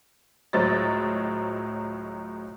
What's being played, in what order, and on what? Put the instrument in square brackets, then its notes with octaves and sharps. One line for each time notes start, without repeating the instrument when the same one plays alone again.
[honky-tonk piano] C#2 A2 F#3 C5 D#5 A6